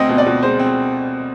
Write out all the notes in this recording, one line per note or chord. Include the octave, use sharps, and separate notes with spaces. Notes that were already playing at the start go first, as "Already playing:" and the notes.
Already playing: D2 C4 D#5
B2
D5
B2
G#3 C5
C4